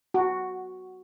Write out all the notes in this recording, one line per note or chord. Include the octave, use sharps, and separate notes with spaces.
F#4